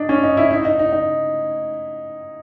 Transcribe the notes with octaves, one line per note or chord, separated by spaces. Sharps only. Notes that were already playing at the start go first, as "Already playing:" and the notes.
Already playing: D4 D#4
C#4
D#4
E4
D#4
D#4
D#4
D#4